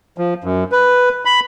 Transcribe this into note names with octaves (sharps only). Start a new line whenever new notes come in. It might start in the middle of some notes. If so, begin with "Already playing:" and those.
F3
F#2
B4
B5